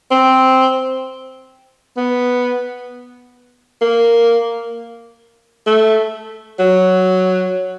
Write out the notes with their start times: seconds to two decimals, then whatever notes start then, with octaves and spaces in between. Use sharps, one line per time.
0.11 C4
1.97 B3
3.82 A#3
5.67 A3
6.59 F#3